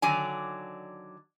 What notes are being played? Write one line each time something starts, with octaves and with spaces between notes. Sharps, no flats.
D3 D#3 F#3 D5 G#5